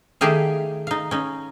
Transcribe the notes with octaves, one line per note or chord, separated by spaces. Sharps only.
D#3 A3 G4 G#4 F5
D#4 F5
C#4 D#4